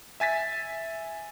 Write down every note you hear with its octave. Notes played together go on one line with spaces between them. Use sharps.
E5 G#5 A6 B6